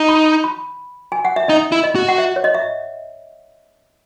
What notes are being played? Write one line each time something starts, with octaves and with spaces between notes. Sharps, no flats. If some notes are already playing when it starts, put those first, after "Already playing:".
Already playing: D#4
B5
B5
G#5
F#5
E5
D#4 D#5
E4
D#5
F#4
F#5
E5
C#5
D#5
E5